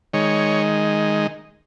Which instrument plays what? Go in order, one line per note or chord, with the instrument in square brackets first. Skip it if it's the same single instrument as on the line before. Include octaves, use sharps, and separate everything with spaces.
[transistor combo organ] D#3 G#3 C#5